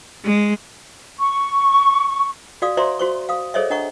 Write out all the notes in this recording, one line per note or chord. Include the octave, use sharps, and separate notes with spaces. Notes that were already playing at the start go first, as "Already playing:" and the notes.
G#3
C#6
F#4 D5 F5 D#6
F#4 C5 D5 E5 A#5 C6
F#4 C5 C#6
F5 D#6
G#4 A4 C5 C#5 D#5 E5
D4 D#5 F#5 A#5 C#6